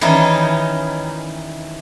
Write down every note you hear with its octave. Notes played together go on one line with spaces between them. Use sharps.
D#3 E3 G3 C#4 D#4